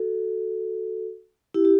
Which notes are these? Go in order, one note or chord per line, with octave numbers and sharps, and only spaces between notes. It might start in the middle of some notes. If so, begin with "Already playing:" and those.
Already playing: F#4 A4
E4 G4
G4